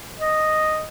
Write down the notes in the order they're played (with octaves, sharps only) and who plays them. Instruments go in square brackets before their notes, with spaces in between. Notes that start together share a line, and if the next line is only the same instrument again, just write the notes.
[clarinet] D#5